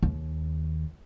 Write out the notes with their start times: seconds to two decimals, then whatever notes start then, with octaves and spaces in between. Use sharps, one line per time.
0.03 D#2